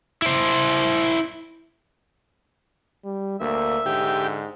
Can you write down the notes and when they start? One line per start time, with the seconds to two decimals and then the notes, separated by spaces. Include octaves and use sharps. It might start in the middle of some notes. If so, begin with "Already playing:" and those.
0.22 E4 C5
3.04 G3
3.40 D2 A#3 E5
3.86 G#2 D3 G4